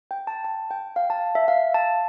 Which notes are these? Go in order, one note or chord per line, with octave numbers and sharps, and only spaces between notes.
G5
A5
A5
G5
F5
A5
E5
F5
A5